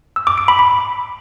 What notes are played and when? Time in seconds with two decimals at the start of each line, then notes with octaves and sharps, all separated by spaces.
0.16 E6
0.27 D6
0.38 D7
0.48 B5
0.59 B5